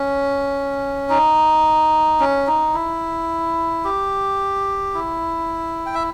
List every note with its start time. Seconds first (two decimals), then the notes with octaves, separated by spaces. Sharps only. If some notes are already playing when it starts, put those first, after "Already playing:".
Already playing: C#4
1.09 D#4
2.20 C#4
2.47 D#4
2.74 E4
3.85 G4
4.94 E4
5.86 G5
5.95 E5